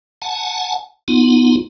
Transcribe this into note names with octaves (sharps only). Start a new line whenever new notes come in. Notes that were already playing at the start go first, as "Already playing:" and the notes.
F#5 G#5 A5
B3 D#4 F4